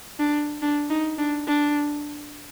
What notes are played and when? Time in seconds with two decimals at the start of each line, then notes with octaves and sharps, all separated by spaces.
0.19 D4
0.62 D4
0.90 D#4
1.18 D4
1.47 D4